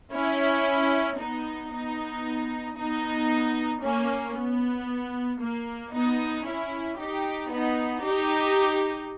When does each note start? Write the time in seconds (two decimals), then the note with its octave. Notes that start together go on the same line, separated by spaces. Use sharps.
0.13 C#4 E4
1.18 B3 D#4
1.71 B3 D#4
2.76 B3 D#4
3.82 A#3 C#4
4.34 B3
5.40 A#3
5.92 B3 D#4
6.46 C#4 E4
6.98 D#4 G4
7.51 B3 D#4
8.03 D#4 G4